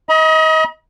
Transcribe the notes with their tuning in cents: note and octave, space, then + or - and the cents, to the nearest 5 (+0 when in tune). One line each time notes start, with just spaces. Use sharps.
D#5 +30 B5 -45